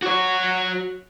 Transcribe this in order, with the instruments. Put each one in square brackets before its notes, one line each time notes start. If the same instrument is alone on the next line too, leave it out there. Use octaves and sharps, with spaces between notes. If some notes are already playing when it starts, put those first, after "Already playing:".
[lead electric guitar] F#4 C#5